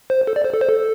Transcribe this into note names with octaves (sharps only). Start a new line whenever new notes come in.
C5
A4
D5
C5
A4
C5
A4